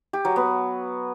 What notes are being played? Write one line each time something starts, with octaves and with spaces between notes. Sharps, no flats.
G4
F#3
B3